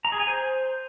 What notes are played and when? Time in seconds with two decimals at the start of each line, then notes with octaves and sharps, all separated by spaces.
0.05 A#5
0.12 G#4
0.20 G#5
0.27 C5